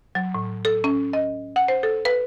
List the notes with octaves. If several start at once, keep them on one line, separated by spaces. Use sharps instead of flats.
F#3
A2
A4
C#4
D#5
F#5
C5
A4
B4